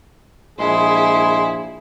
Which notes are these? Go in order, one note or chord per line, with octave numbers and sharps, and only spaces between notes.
A#1 G#3 E4 G#4 C6